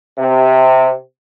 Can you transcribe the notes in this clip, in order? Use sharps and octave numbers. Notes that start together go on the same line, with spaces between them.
C3